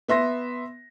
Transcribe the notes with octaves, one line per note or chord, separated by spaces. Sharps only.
B3 E5 C6 A#6